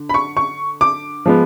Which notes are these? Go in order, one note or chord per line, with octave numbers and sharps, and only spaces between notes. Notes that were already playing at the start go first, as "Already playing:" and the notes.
Already playing: D3
B5
C#6
C#6
D6
F3 G#3 B3